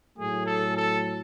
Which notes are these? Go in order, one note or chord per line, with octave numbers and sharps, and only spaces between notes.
A2 F#3 A3 G#4
A4
A4